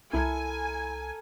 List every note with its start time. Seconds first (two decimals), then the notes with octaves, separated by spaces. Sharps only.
0.13 C2 E4 A4 A#4 G#5